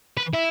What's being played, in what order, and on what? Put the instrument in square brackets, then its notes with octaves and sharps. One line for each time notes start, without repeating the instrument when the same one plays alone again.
[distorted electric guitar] B4
E4